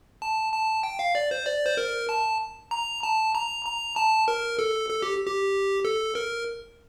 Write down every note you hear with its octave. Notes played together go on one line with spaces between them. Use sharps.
A5
A5
G5
F5
D5
C5
D5
C5
A#4
A5
A#5
A5
A#5
A#5
A5
A#4
A4
A4
G4
G4
A4
A#4